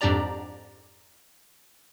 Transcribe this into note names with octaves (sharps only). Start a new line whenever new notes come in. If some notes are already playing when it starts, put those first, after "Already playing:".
F2 G#2 D4 G4 D5 A#5